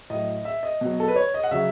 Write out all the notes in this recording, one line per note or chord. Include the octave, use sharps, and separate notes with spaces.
A2 F#3 D#5
E5
D#5
B2 F#3
A4
B4
C#5
D#5
F#5
C#3 F#3 E5